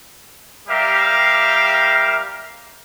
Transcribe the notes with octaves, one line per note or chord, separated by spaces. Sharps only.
G3 G4 A#4 E5 F5